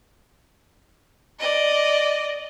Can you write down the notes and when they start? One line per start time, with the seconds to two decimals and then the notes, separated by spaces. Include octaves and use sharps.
1.39 D5 D#5